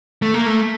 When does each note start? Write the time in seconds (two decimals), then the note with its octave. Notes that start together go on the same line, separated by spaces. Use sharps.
0.22 A3
0.34 A#3
0.47 A3